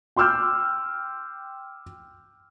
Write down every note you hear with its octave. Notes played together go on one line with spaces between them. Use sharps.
G5 C6 D6 E6 F6 G6